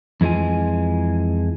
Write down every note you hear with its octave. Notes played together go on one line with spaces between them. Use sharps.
F2 E3 G#3 F4 G#5